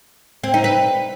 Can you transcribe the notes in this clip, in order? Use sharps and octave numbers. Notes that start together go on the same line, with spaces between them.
C4
D#4
B4